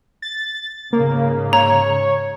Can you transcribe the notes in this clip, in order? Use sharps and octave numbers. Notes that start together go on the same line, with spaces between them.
A6
G#2 C#3 A#3
C#5 A#5